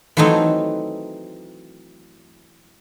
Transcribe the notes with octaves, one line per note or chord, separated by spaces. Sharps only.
E3 F#3 A3 C4 D#4